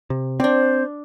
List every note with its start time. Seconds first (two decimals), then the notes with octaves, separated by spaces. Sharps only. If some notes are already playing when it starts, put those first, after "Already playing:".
0.10 C3
0.40 C4 D4 C5 D5